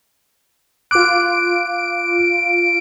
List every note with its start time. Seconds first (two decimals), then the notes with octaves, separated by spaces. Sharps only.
0.91 F4 D6 F#6 D7